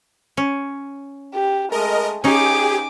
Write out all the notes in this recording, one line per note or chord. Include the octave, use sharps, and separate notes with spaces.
C#4
G4
G#3 A3 A#4 D#5
C#4 D#4 G4 G#4 G#5 D6